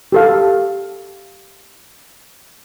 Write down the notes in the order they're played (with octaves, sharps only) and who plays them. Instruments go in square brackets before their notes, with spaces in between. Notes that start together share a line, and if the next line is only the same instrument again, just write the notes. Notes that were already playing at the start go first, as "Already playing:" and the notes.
[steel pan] G4 A4 F5